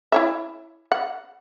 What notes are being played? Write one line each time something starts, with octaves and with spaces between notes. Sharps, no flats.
E4 C#5 E5
F#5